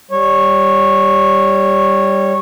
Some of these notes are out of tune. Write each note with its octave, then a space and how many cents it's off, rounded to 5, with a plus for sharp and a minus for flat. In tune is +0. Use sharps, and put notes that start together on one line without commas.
G3 +0 C#5 -15